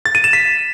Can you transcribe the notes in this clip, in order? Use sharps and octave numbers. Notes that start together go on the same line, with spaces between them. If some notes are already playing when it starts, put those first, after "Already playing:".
A6
D#7
E7
B6